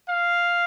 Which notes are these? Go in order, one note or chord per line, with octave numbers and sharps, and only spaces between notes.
F5